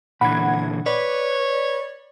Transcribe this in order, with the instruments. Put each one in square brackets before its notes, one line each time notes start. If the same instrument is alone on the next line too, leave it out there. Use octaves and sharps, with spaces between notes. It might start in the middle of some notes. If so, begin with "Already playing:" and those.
[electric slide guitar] A#2 D3 E3 [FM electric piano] F#5 G#6 [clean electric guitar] B5
[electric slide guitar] B4 [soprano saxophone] C#5 [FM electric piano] D5